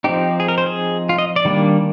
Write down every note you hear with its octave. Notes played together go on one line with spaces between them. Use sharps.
F3 C4 D#4 G4
G#4
A#4
C5
G#4
F4
D#5
D5
D#3 G3 A#3 D4